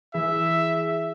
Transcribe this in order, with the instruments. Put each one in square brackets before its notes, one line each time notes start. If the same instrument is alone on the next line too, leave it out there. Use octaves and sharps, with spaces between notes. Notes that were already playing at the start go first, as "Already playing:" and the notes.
[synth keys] E3 E4 G#4 [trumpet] E5